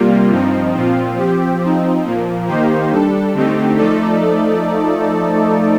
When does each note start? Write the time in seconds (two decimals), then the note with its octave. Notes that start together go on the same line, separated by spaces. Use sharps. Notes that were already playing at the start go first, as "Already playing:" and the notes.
Already playing: C3 G3 A#3 F4
0.31 G2 F3 C4 D#4
0.75 A#2 F3 C4 F4
1.18 F3 C4 G4
1.61 F3 C4 D#4
2.05 A#2 F3 A#3
2.47 D#3 A#3 D#4 G4 C5
2.91 G3 D4 A4
3.34 D3 A3 C4 D#4 G4
3.77 F3 A3 D#4 A4 D5